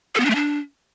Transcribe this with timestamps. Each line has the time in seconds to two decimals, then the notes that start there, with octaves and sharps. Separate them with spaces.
0.15 A4
0.20 B3
0.25 D4
0.30 A3
0.35 D4